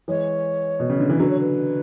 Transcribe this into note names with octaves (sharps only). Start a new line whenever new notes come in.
E3 G#3 C#5
B2
C#3
D3
E3
D3 F#3 B4
C#5
B4